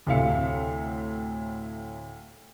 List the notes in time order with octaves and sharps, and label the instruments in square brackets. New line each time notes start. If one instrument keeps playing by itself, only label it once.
[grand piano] D2 A2 C3 E5 F5 C#7